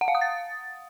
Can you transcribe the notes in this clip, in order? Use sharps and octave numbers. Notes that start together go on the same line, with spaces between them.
F#5
F5
D#6
A6